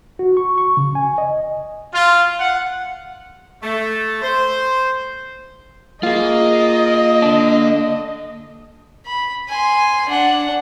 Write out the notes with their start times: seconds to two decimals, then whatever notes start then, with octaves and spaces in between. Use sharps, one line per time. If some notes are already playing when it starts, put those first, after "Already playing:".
0.19 F#4
0.37 C#6
0.58 C#6
0.77 C#3
0.95 G#5
1.18 D#5
1.94 F4
2.40 F#5
3.62 A3
4.22 C5
6.03 A#3 F4 G#4 D#5
7.22 D3 D4
9.06 B5
9.49 G#5 C6
10.09 D4 F#5